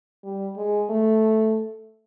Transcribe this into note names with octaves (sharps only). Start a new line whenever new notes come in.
G3
G#3
A3